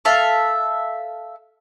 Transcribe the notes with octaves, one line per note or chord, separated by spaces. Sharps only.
A4 E5 F5